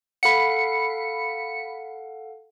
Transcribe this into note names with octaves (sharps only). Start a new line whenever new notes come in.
A4 F5 F#5 B5 C#7